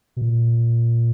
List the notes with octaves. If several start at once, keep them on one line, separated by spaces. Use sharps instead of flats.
B2
A#2